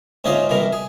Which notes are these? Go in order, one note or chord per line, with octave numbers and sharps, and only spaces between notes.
D2 G#2 C#4 D#4 F4 D#5
C2 B2 E3 A#4
G#4